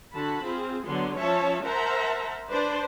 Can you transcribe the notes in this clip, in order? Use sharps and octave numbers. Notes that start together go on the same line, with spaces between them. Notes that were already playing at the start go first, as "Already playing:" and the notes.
D3 F#4 A5 B5
C4 F4 G#4
D3 F#3 B3 C6
F3 C#4 C#5 E5 A5
A#4 C5 E5 F#5 A5 A#5
D4 B4 C5 D5